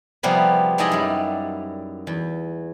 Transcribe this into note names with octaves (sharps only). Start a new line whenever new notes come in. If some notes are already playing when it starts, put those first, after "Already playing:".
C3 F3 G3 A#3 B3 G#4
G#3 D#4 E4 G#4 D5 D#5
F#2 G3
E2